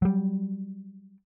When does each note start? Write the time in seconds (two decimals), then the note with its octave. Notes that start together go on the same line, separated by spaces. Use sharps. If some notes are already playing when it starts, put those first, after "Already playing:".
0.02 F#3 G3